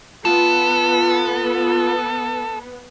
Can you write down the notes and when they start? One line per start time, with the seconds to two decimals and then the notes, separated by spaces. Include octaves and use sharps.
0.25 B3 F4 A4